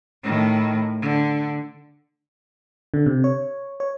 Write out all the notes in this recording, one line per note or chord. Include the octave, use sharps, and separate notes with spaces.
A2 D#3
D3
D3
C3
C#5
C#5